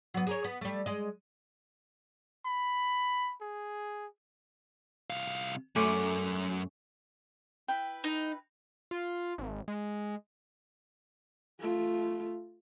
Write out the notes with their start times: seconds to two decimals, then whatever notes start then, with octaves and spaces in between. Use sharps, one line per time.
0.14 F#3 B3
0.27 G#4 A#4 C#5
0.44 B3
0.61 G3 A3
0.86 G#3 D#5
2.46 B5
3.41 G#4
5.10 C2 F5
5.76 F#2 A3 C#4 D5
7.68 E4 B4 G5
8.04 D#4
8.91 F4
9.38 G#1
9.68 G#3
11.60 A3 F4